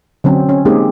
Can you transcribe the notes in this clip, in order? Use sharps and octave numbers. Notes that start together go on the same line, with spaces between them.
D3 F#3 C4 C#4
C#4
G#3 A#3 C4 D#4 G4 G#4